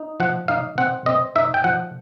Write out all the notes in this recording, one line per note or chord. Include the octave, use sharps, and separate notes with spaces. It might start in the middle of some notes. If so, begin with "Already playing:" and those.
Already playing: D#4
F3 F#5
D#4 F5
C4 F#5
C4 D#5
D#4 E5
G5
F3 F#5